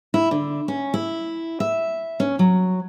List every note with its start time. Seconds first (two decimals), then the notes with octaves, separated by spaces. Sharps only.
0.14 E4
0.31 D3
0.68 C#4
0.94 E4
1.60 E5
2.20 C#4
2.39 F#3